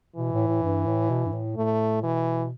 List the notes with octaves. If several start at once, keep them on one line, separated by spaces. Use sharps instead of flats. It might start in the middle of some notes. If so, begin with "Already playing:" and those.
B2 E3
A2
A2
G2
A2
B2
G2
A2
A2 A3
B2 E3